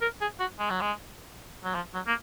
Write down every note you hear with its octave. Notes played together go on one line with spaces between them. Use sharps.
A#4
G#4
F#4
G#3
F#3
G#3
F#3
F3
F#3
A#3